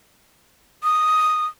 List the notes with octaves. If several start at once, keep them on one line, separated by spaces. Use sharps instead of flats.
D#6